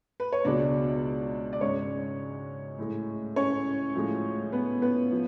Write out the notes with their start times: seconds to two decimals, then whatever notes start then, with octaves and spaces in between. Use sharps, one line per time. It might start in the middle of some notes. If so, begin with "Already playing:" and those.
0.20 B4
0.32 C#5
0.45 C#2 B2 G#3 D4 D5
1.53 D5
1.61 G#2 G#3 C#4 C#5
2.78 A2 G#3
3.36 C#4 C#5
3.94 A2 F3 G#3
4.52 B3 B4
4.82 B3 B4
5.12 F3